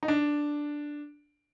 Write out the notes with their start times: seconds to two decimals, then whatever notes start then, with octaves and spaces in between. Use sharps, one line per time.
0.03 D#4
0.08 D4